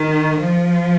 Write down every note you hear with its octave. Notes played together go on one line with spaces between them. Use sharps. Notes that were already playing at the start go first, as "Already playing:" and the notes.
Already playing: D#3
F3